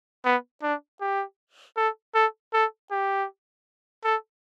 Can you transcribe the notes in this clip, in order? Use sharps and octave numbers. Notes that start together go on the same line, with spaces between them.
B3
D4
G4
A4
A4
A4
G4
A4